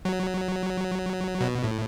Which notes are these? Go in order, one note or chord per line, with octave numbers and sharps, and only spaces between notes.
F#3
B2
A2